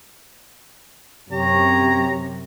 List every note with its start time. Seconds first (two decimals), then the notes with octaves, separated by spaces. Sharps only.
1.32 F#2 C3 G4 C#5 A#5